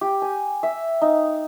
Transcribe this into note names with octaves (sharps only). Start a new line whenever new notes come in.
G4
G#5
E5
D#4